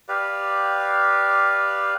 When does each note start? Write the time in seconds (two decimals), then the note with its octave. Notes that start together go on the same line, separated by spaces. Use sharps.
0.08 G4 B4 D5 F5